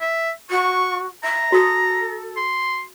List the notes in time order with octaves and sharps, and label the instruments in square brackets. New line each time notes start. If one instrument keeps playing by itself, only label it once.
[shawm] E5
[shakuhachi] F#4 [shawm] C#6
[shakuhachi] E5 [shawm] A#5
[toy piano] F#4 D#6 [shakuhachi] A4
[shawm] C6